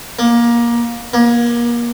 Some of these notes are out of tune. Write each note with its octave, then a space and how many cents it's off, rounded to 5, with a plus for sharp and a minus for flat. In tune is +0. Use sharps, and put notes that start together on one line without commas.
A#3 +20
A#3 +30